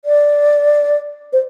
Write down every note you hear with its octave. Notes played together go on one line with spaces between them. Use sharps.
D5
C5